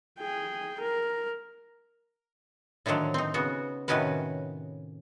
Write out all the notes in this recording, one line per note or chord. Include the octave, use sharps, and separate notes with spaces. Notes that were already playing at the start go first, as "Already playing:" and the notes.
G#4 G5
A#4
A2 D3 D#3 F3 F#3
C4 D#4
C#3 B3 F#4
A2 C3 D#3 C#4 F#4 B4